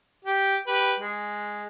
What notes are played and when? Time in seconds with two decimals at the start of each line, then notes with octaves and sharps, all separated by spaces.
0.24 G4
0.67 G4 B4
0.99 G#3